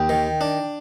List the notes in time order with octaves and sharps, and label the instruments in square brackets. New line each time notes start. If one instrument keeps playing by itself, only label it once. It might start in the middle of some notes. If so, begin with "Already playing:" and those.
Already playing: [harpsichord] D#2 [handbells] G5
[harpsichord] D#3
D4